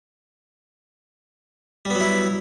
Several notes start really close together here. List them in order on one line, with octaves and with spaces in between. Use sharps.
G3 B3 F#3 E4